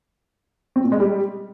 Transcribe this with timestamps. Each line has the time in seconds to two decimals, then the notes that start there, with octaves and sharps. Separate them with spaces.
0.76 C4
0.84 A#2
0.92 G#3
1.00 G3